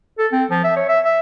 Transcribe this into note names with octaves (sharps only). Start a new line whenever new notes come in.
A4
C4
F3
E5
C#5
E5
E5